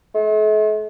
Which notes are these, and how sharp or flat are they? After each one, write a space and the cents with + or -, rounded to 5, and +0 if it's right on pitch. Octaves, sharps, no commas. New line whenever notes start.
A3 -45